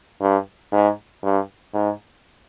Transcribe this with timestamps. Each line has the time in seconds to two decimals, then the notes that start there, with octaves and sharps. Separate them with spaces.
0.21 G2
0.72 G#2
1.23 G2
1.74 G#2